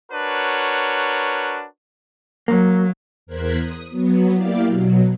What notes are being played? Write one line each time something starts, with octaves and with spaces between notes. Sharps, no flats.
D4 F#4 A#4 B4 C#5
F#3 A#3
E2 A#4 C5 F#6 G#6 B6
D#6
F#3 B3
A#3 E4 G4 D5 F5
B2 F#3